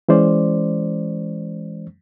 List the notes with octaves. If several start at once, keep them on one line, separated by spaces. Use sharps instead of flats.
E3 G#3 C#4 C5 D5